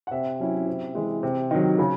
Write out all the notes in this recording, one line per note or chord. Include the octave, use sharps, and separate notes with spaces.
F#5
C3 E5
F#3 C#4 E4
C3
E3 G#3
C3
D#3 F#3
C#3